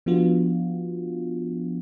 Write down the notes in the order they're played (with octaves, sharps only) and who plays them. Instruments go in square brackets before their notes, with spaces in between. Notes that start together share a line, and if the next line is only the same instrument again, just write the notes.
[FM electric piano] F3 B3 D4 F4 F#4